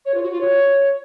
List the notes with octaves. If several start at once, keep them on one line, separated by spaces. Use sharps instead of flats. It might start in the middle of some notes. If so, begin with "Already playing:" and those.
C#5
F4
F#4
F4
C#5